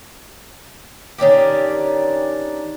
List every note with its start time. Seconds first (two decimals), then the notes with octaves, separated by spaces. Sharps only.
1.18 D#3 C#4 D4 G4